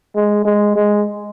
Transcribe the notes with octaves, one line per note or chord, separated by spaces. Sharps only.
G#3
G#3
G#3